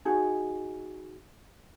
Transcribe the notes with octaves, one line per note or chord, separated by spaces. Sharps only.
D#4 F#4 G#4